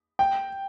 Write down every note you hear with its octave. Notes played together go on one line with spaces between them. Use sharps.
G5